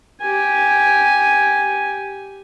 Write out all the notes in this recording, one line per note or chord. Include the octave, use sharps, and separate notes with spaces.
G4 G#5